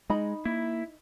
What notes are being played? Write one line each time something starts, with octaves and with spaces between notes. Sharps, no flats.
G#3 D#4 D#5 B5
A#3 E4